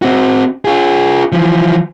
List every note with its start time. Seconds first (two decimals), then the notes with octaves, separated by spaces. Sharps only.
0.02 C4 F#4
0.65 F4 G#4
1.32 E3 F3